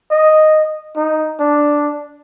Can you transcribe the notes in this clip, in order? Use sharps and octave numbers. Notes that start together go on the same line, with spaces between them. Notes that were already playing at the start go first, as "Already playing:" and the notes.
D#5
D#4
D4